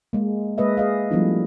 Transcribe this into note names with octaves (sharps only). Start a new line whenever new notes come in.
G#3 A#3
G#3 A#3 G#4 B4 D#5 E5
G#4 D#5 F5
F3 G3 A3 B3 D4 E4